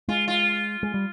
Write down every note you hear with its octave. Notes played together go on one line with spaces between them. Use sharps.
G#3 F4
F4
G#3
G3